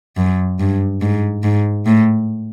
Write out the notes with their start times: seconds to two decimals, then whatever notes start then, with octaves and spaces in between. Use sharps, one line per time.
0.17 F#2
0.59 G2
1.01 G#2
1.43 G#2
1.86 A2